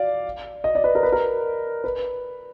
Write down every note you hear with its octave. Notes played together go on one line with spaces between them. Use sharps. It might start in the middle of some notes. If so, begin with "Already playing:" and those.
Already playing: D5 F5
D#5
D5
B4
A#4
B4
A#4
B4